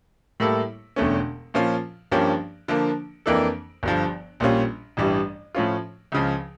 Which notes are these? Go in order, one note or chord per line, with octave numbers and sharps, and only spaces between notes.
A2 G3 A#3 E4 A4
E1 E2 D3 A3 C#4
A#2 F3 C#4 F4
G2 F3 A#3 C#4 G4
D3 F3 A#3
F2 E3 A#3 D4 A4
G1 G2 F3
A#1 A#2 G3 C#4 F4
A1 G2 E3 G3
A2 F3 C#4 F4
C#2 C#3 F3